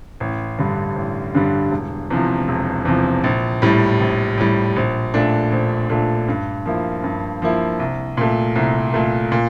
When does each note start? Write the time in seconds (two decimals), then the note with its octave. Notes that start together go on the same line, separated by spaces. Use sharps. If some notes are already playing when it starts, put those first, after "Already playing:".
0.20 A1
0.58 G2 D3 G3
0.96 A1
1.35 G2 D3 G3
1.71 E1
2.10 E2 C3 F3
2.48 E1
2.85 E2 C3 F3
3.24 A#1
3.62 A2 G3
4.00 A#1
4.38 A2 G3
4.76 A#1
5.14 A#2 A3 D4
5.52 A#1
5.90 A#2 A3 D4
6.28 G2
6.66 F3 A#3 E4
7.04 G2
7.42 F3 A#3 E4
7.79 C2
8.17 A#2 A3
8.56 C2
8.94 A#2 A3
9.32 A#2